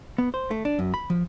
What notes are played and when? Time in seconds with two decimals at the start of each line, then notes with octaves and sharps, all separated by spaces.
0.18 B3
0.34 C5
0.51 A3
0.65 D4
0.79 F#2
0.94 B5
1.10 F3